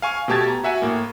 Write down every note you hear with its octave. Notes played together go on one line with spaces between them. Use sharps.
F5 G#5 C#6
B2 A3 G4 A5 G#6 A6
A#5
F#4 E5 F#5 G#5
A2 A#3